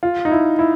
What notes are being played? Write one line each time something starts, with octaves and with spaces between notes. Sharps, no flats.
F4
D#4
E4
E4